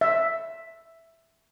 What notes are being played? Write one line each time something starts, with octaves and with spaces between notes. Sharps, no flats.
E5